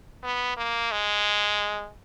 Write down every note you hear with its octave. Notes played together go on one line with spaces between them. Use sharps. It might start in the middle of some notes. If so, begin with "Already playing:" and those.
B3
A#3
G#3